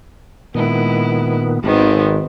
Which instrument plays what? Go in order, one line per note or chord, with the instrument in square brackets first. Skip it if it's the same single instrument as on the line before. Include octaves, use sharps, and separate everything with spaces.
[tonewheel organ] A#2 D#3 B3 [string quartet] G#3 E4
[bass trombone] G#1 [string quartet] D#3 B3 C4